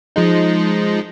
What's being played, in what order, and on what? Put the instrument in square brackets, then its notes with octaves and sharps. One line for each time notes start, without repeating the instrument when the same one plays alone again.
[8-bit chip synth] F3 G#3 D#4